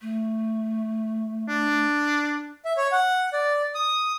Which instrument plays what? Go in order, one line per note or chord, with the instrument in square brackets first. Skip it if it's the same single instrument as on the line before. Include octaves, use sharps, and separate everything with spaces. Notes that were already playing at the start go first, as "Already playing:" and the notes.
[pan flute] A3
[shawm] D4
[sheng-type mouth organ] E5
C#5
F#5
D5
D#6